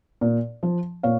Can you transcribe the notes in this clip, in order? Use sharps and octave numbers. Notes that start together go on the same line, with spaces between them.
A#2
F3
A#2 C#5 F5